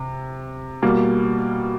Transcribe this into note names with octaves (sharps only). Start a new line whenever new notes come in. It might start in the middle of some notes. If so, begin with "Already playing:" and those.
Already playing: C3
B2 G3 A#3